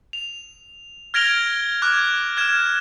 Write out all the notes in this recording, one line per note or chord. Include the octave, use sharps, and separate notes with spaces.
F7
F6 G#6 A#6 D7 F7 G7
D6 F#6 G#6
F6 G#6 E7